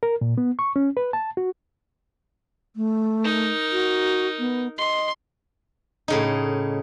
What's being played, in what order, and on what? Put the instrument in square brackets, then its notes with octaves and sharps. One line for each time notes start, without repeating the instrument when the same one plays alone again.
[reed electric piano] A#4
A#2
B3
C#6
C#4
B4
A5
F#4
[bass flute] A3
[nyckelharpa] D#4 A#4
[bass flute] F#4
B3
[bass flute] D#5 [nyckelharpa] C6
[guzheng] A2 C#3 D#4